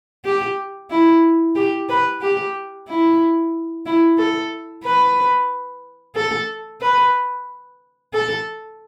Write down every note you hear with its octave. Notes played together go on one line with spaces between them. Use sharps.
G4
E4
G4
B4
G4
E4
E4
A4
B4
A4
B4
A4